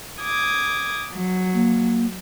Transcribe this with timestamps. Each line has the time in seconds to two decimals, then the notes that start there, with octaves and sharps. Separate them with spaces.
0.22 D6 D#6 G#6
1.13 F#3
1.54 A#3